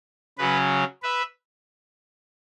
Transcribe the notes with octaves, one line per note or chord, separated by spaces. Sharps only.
C#3 F#3 C#4 B4
B4 E5